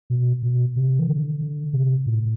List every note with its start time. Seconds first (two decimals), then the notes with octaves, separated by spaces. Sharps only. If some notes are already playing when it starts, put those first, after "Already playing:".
0.10 B2
0.43 B2
0.76 C3
0.99 E3
1.08 D3
1.41 D3
1.73 C3
2.06 A2